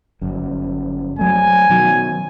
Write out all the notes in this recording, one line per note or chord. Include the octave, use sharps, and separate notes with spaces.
G1 F#2
F#3 A3 G#5
B2 D#3 F#3